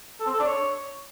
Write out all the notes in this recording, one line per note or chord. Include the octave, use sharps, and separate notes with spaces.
A4
C4
A4
D4
C#5